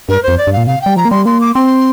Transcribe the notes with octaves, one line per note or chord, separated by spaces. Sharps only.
G2 A#4
F2 C5
D5
G2
A#2 F5
C3 F5
G3 G5
F3 A#5
A#3
G3 C6
A#3 C6
D6
C4 C6